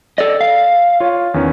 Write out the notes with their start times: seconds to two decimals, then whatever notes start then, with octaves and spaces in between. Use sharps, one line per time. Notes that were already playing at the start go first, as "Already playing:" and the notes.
0.18 A4 D5 D#5
0.41 F5
1.00 F4 C#5
1.34 E2 D#3 C#4